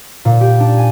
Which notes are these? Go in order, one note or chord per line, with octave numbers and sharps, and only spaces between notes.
A#2
G4
D4
G#5